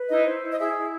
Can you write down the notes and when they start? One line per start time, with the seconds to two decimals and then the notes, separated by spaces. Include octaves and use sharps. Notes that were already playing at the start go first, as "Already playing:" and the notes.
Already playing: B4
0.10 D#4 E4 D#5
0.26 C5
0.43 E4
0.52 D#5
0.59 E4 G#4 E5
0.76 E4